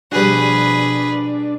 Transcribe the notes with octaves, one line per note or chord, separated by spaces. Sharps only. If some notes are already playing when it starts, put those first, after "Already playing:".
B2 F3 G3 D4 F#4 G#4 B4